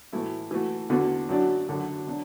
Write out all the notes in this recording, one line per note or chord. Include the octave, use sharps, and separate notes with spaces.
A2 E3 A3 E4
E3 A3 F#4
E2 D3 B3 F#4
F#2 F#3 D4 F#4
F#2 D3 F#3
B2 F#3 D4